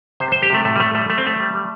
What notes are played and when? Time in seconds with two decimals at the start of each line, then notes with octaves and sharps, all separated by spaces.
0.20 C3 C5
0.32 C3 C5
0.42 G4
0.50 C3 A3
0.65 A2 A3
0.76 G3
0.80 A2 A3
0.95 G3 A3
1.10 G3 A3
1.18 C4
1.24 G3 A3
1.39 G3
1.54 G3